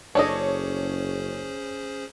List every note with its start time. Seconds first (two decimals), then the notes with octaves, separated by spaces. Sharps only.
0.15 F#1 C#4 D4 G#4 A4 C5 C#5 D#5